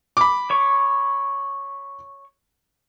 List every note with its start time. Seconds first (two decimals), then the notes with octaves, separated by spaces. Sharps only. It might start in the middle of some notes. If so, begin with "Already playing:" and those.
0.17 B5 D6
0.50 C#5 C#6